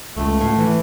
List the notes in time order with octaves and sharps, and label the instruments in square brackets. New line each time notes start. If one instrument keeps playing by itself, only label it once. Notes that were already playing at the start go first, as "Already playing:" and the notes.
[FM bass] C#2 [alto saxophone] A3
[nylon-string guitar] A2
[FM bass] E3